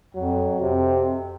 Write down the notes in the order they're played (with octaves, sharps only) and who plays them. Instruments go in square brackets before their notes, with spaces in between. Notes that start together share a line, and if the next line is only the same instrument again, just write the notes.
[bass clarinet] F2 [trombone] F#3
[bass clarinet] F2 [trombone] C3